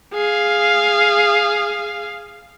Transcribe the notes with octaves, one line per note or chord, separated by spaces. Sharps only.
G#4 F5